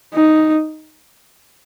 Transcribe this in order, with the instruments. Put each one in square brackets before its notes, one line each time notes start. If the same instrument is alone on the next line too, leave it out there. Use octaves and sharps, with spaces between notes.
[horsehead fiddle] D#4